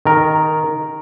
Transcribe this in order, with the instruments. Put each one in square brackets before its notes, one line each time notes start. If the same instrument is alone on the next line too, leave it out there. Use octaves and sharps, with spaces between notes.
[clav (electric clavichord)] D#3 A#4